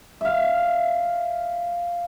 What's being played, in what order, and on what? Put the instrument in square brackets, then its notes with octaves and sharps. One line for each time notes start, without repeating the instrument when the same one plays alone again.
[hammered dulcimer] E5 F5